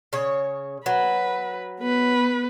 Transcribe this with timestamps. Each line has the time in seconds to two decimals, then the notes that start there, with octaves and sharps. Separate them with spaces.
0.13 C#3 C#5
0.86 F#3 B4
1.80 B3 B4